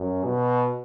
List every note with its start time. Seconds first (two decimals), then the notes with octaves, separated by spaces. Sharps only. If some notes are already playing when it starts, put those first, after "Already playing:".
Already playing: F#2
0.24 B2